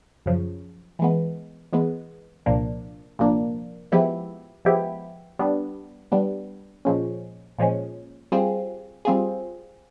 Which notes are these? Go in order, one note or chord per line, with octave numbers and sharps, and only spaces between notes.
F#2 C#3 F3
E3 G#3 B3
E3 G#3 B3
C2 A#2 F3 A#3 D4
C2 A#2 F3 A#3 D4
F3 G#3 B3 E4 G4
F3 G#3 B3 E4 G4
G3 B3 D4
G3 B3 D4
A#2 F3 G#3 C#4
A#2 F3 G#3 C#4
G3 C4 F4 G#4
G3 C4 F4 G#4